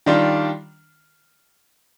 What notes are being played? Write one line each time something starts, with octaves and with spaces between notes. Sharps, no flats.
D#3 G3 D4 F4